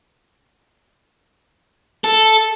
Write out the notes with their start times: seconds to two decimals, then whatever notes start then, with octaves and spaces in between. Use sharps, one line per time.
2.04 A4